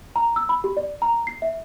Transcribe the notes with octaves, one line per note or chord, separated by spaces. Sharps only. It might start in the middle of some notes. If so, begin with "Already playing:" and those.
A#5
E6
B5
G4
D5
A#5
C7
E5